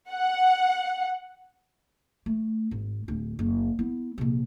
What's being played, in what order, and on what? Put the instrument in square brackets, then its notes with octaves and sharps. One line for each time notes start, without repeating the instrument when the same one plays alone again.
[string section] F#5
[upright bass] A3
G#1
D1 D2
F#1
B3 E4
A#1 C3